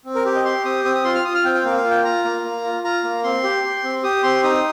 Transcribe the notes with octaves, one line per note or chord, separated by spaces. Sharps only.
C4
A#4
G4
D#5
G4 C6
C4 D#6
C4 D#6
D#6
F4 C6
F6
F4 D#6
F6
C4 G5
G5
A#3 F5
F5
F4
G5
F4 A#5
A#3
A#3
F4
F4 A#5
A#3
C4 C6
G4
G4
C4
G4 D#6
C4 C6
D#4 D#6